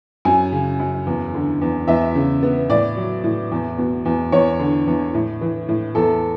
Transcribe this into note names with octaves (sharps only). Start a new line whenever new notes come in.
F#2 G#5
C#3
F#2
E2
D3
E2
E2 E5
C#3
B3
A2 D5
F#3
A2
E2
B2
E2
E2 C#5
D3
E2
A2
E3
A2
E2 A4